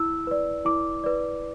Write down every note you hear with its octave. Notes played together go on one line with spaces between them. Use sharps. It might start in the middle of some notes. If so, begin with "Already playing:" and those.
Already playing: E4 E6
B4 D5
E4 D6
B4 D5